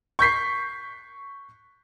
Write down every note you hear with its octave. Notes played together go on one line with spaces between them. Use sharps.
C#6 G6 B6 C7